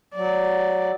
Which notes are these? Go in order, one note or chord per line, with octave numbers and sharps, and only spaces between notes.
F#3 D5